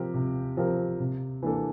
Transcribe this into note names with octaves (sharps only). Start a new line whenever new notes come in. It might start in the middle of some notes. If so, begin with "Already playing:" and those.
Already playing: C3 F3 C4 G4 A#4
C3
F3 C4 G4 A#4
C3
E3 A#3 D4 A4